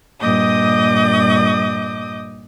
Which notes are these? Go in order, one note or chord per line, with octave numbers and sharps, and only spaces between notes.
G2 A#2 D#5 D6 D#6 G6